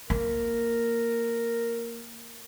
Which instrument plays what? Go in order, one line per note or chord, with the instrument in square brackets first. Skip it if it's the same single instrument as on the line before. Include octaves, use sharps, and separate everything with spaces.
[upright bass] A#3 [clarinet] A#4